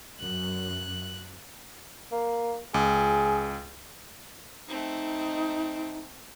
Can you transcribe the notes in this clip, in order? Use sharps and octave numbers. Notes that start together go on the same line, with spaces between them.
F#2 F#6
A#3
C#2 G#4
A3 C4 D#4